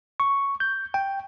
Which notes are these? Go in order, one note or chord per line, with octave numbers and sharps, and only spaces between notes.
C#6
G6
G5